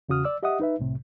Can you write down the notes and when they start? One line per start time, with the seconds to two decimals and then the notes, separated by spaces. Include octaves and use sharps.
0.09 E2 C#3 F#4 D#6 F6
0.25 D5 E6
0.43 G4 D#5 E5 F#5 D#6
0.60 D#4 B4 E5
0.79 C2 A2 C3